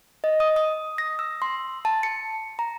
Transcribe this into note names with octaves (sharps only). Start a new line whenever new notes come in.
D#5
D#6
D#6
A#6
E6
C6
A5
C#7
A#5